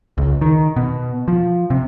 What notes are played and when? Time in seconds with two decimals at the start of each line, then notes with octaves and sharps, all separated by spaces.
0.18 C#2
0.41 D#3
0.76 B2
1.28 F3
1.70 C3